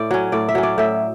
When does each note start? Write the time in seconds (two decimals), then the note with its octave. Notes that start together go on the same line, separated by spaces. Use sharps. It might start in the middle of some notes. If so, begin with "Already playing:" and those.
Already playing: A2 D5
0.11 F#3 C#4
0.32 A2 D5
0.49 E5
0.55 F#3 C#4
0.63 D5
0.78 A2 E5